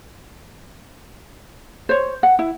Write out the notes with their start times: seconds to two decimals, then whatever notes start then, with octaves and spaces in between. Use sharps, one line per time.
1.89 C5 C#5
2.23 F#5
2.39 E4